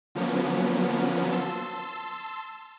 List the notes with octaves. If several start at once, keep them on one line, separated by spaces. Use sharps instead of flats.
D3 F3 F#3 A#3 B3 C#4
A5 C6 E6